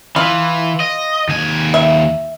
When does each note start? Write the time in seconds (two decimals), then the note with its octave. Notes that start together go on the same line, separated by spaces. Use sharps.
0.16 E3 F4
0.80 D#5
1.29 D#2 G#5
1.74 E5